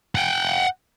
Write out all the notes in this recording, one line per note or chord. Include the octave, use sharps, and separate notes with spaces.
F#5 G5